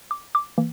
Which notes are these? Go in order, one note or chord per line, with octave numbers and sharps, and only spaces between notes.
D6
D6
E3 A#3